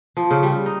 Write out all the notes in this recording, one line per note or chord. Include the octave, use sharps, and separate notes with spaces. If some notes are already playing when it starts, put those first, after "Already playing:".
F3
C#3
G3
D#4